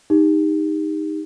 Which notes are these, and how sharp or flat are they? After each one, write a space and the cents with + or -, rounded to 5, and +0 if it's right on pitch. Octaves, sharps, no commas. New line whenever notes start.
D#4 +0 G4 +35